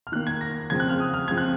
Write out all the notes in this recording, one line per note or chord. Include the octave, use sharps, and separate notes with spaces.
F6
D#3 A#3 F#6
G#6
A#6
C#3 F3 C4 G#6
F#6
F6
D#6
F6
C#3 F3 C4 G#6
F#6